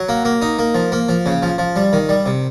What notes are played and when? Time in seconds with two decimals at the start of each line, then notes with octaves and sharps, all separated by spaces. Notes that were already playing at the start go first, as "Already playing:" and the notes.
Already playing: F#3
0.09 A#3
0.25 A#3
0.42 D#4
0.59 A#3
0.75 F3
0.92 A#3
1.09 F3
1.26 C#3
1.43 F3
1.58 F3
1.76 G3
1.93 D#3
2.09 G3
2.26 C3